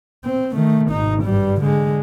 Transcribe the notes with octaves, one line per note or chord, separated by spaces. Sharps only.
C4
D#3 A3
G#1 D#4
G2 G3
D3 G#3